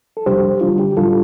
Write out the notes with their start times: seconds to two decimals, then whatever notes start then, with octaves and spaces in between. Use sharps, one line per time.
0.17 A4
0.26 F2 C3 G3 D4 G4 C5
0.61 D3 G3 D4 F4
0.79 G4
0.97 A2 G3 D4 F4 A4